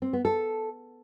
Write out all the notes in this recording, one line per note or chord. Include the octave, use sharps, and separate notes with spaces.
C4
B3
A4